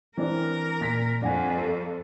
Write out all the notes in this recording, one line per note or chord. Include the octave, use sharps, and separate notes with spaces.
E3 C4 D4 A#4
A#2 A#6 B6
F2 D4 F#5 G#5
A4